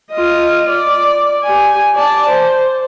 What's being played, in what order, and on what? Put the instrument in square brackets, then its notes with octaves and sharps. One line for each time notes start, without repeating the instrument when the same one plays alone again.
[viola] F4 D#5
D5
G4 G#5
D5 A5
C5